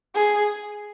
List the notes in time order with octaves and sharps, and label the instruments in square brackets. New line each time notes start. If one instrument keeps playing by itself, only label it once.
[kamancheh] G#4